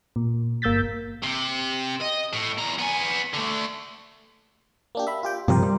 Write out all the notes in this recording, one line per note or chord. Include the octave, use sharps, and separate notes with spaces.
A#2
G1 A#3 E6 G6 A6 B6
C3
D#5
A2
E2 A#5
B3 G#5
D3 A3
A#3 D4 G4
E5 B5
F4 G4 G5
G2 C3 F3 G4 A#4 C5
G3